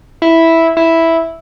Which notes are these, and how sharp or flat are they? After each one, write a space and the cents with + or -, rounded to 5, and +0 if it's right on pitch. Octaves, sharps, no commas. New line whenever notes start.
E4 -5
E4 -5